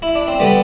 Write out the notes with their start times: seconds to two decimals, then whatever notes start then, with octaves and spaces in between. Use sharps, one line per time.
0.02 E4
0.15 D4
0.28 C4
0.40 D3 G3 B3